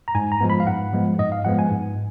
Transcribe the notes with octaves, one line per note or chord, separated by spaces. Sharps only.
A#5
G#2 G#5
A#5
F3 G#3 B3
B5
F5
G#2 F#5
F3 G#3 B3
G#2 D#5
F5
F3 G#3 B3 F#5
G#5
G#2